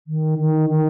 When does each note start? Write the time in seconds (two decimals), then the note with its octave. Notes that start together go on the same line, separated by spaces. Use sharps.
0.07 D#3
0.39 D#3
0.70 D#3